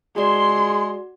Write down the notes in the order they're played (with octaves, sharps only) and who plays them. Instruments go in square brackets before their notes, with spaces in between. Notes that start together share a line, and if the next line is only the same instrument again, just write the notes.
[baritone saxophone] G#3 [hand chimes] F#4 D5 [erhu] C6